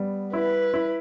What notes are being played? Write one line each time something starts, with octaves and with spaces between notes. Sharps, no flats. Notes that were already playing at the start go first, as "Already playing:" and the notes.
Already playing: G3 B3
E4 B4
E4